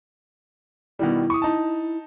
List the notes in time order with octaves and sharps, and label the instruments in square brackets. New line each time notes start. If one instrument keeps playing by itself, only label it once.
[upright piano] B2 D#3 G3 [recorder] E4
[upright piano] C#6 D#6
D#4 A5